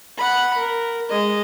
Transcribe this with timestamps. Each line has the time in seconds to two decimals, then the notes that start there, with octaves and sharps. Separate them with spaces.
0.17 F#5 B5
0.57 A#4
1.09 G#3 D#5